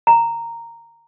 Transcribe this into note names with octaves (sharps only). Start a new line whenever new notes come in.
A#5